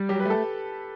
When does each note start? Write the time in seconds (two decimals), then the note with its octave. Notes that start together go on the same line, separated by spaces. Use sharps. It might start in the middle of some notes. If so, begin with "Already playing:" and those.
Already playing: G3
0.09 F#3 G4
0.20 B4
0.25 A3 A4